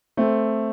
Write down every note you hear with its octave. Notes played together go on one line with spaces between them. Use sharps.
A3 C4